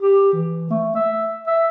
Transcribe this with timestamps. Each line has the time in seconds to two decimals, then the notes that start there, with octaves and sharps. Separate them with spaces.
0.01 G4
0.33 E3
0.70 A3
0.95 E5
1.47 E5